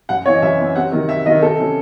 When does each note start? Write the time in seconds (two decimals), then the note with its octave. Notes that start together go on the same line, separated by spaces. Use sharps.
0.09 F#2 F#5
0.26 E3 C4 C#5
0.34 D#5
0.42 F#2 E5
0.59 E3 C4
0.75 C3 F#5
0.92 D#3 F#3
1.09 C3 E5
1.26 D#3 F#3 D#5
1.42 C3 A4
1.59 F#3 C#4